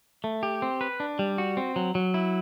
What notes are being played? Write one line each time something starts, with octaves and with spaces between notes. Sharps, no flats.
A3
G4
C4
B4
D4
G3
F#4
C4
F#3
F#3
E4